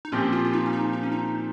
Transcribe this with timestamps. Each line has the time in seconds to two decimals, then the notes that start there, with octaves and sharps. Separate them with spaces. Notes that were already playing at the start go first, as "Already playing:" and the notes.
0.05 D#4
0.12 A#2 F3 C4 C#4 G4
0.33 F4
0.45 F4
0.53 D#4
0.66 C#4
0.73 D#4
0.93 D#4
1.03 C#4
1.12 D#4